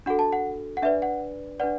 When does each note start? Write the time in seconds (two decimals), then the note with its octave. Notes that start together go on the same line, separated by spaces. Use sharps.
0.06 D4 F#4 A4 F#5
0.19 A5
0.32 F#5
0.77 F#5
0.82 D4 B4 D5 E5
1.02 F#5
1.60 D4 B4 D5 F#5